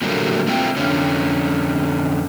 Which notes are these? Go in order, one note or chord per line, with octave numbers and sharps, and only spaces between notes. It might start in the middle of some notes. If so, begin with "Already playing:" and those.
A#2 D3 F#3 G3 A3 A#3
A3 C4 E4 F4 G5
F2 D3 C#4